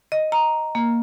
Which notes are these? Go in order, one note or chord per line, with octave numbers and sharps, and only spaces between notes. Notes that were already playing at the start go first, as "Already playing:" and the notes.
D#5
A#5
A#3